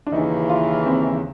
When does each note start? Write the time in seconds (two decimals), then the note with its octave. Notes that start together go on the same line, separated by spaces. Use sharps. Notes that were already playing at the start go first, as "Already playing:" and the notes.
0.07 D4
0.12 D#2 C#3 E3 D#4
0.49 F4
0.86 C4